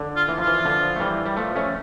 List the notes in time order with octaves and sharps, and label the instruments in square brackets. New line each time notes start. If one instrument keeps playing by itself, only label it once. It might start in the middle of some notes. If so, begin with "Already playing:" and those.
Already playing: [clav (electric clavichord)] D3
[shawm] F4
[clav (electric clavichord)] E3
[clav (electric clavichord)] F3 [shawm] F4
[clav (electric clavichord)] E3
D3 F3
A3
E3 G3
G3
F3 A3
A3 C#4